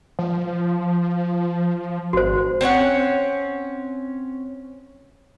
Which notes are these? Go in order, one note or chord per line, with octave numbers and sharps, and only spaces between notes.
F3
G#1 F#4 C5
C4 C#4 C#5 F#5